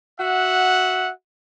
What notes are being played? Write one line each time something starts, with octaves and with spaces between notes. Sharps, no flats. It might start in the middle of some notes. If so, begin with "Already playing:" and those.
F#4 E5 F#5